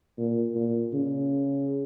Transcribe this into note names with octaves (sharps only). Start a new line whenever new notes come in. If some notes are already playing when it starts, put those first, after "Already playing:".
A#2
A#2
C#3